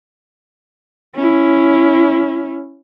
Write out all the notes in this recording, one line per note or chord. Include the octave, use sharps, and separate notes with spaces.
C#4 E4